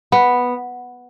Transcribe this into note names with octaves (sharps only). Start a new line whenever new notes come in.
B3